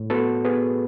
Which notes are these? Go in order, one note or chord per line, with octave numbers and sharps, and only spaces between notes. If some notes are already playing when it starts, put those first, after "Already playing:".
Already playing: A2
B3 F#4 A4
B3 G#4 B4